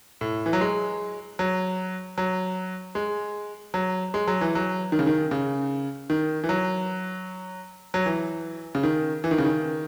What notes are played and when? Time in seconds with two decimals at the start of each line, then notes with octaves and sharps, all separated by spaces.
0.21 A2
0.46 E3
0.53 F#3
0.61 G#3
1.39 F#3
2.18 F#3
2.95 G#3
3.74 F#3
4.14 G#3
4.28 F#3
4.41 E3
4.55 F#3
4.92 D#3
4.99 C#3
5.07 D#3
5.31 C#3
6.10 D#3
6.44 E3
6.49 F#3
7.94 F#3
8.06 E3
8.75 C#3
8.83 D#3
9.24 E3
9.31 D#3
9.38 C#3
9.45 D#3